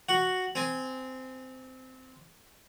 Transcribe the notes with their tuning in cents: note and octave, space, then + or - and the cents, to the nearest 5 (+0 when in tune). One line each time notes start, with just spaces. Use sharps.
F#4 +0 F#5 +0
C4 -15 G#5 +0